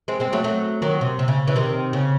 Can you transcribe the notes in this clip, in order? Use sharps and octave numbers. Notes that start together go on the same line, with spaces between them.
G#3 C4
G#3 C4
F#3 A3
F#3 A3
D#3 F#3
C3
C3
C#3
C#3 E3
C3 D#3
C#3